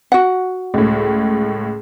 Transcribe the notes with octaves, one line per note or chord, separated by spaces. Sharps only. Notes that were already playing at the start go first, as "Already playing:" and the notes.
F#4 F#5
C#2 A2